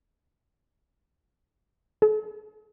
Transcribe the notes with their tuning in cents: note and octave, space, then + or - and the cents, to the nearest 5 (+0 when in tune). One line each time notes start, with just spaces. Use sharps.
A4 -45